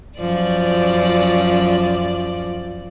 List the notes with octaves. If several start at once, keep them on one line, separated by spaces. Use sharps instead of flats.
F#2 F3 D5